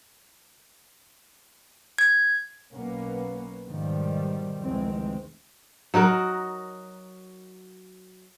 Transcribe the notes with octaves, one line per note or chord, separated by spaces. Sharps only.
G#6
B1 A#3 B3 C#4
G#2 B2 D#3 F3 G3
F1 C#2 D#3 E3 G#3 C4
F#3 D#4 F#4 A#4